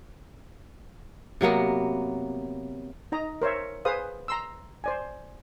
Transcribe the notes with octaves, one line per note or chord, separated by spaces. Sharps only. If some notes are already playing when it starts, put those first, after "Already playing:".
C3 F#3 A#3 B3
D#4 D#5 A#5
A#4 C5 C#5 E5
G#4 B4 C5 F5 D#6
A#5 C6 E6
C5 D5 G#5